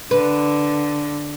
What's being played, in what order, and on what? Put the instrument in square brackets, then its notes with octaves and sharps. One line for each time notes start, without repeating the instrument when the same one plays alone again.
[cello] D3 [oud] B4